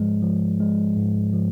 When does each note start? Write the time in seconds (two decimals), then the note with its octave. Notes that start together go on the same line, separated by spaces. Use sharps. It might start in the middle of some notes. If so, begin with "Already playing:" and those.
Already playing: G#2 F3 G#3
0.22 F3
0.60 G#3
0.97 G#2
1.33 F3